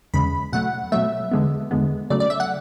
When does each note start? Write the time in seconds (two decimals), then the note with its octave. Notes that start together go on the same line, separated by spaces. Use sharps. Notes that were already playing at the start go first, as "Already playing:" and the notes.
0.14 E2 C#3 G#3 B5
0.53 B2 F#3 A3 F#5
0.92 B2 F#3 A3 E5
1.32 E2 D3 G#3 B3
1.71 E2 D3 G#3 B3
2.10 C#3 F#3 A3 D5
2.20 D5
2.30 E5
2.40 F#5